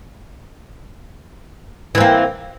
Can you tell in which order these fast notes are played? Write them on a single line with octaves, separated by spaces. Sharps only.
E3 C4 A#3